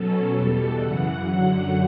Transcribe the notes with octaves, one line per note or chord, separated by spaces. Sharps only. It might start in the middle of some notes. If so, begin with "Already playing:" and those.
Already playing: B2 F#3 C#4 A4
E2 B2 G3 A4
F#2 C#3 E3 F#5
F#2 D3 F#3 F#5